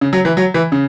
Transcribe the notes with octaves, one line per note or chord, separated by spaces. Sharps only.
C#3
F#3
E3
F#3
E3
C#3